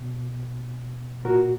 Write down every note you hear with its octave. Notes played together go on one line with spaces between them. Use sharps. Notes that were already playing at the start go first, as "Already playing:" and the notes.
Already playing: B2
A#2 F#4 A#4